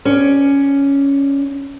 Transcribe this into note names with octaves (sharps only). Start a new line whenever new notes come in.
C#4 D5